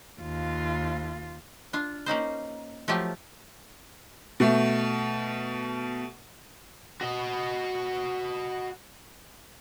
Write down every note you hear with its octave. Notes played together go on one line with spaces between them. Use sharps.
D#2 F4
D4 F4
A#3 C#4 D#4 C5
F3 F#3 A3 F4 G4
B2 A3
F#4 D#5